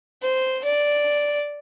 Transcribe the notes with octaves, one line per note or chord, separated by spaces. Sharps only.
C5
D5